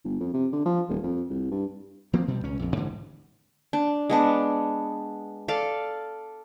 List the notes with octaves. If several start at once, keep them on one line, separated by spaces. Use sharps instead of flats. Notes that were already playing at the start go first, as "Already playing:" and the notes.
G1
F2
C3
D3
F3
D#1
F2
C2
G2
F3 A#3 C4
B2 G3
C#2 C#4
A#1 F2
G#2 D3 E3 G3
D4
G#3 B3 D4
A4 D5 F5